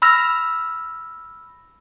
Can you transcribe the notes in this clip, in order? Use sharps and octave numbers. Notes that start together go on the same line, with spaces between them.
B5 E6 F6 A#6